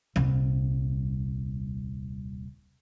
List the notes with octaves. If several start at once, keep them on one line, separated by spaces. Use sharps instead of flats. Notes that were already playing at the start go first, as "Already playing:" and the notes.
D#1 C2